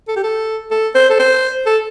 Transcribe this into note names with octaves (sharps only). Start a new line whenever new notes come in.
A4
G4
A4
A4
C5
A4
C5
A4